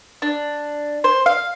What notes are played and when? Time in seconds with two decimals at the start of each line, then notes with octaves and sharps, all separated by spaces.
0.22 D4
1.04 C5
1.26 F5